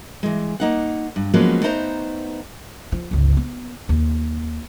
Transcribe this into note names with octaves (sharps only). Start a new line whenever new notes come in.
E3 G#3
A#3 D#4 F#5
G2
F3 F#3 G#3 A#3 B3 C#4
A3 B3 D#4 C5 A#5
F3
G1 C#2
B3
D#2